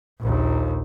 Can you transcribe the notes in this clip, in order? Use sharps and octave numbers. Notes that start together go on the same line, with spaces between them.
A#1 D#2